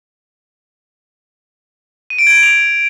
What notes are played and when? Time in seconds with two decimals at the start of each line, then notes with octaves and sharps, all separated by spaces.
2.10 D#7
2.19 D7
2.27 G#6
2.35 D7
2.43 F7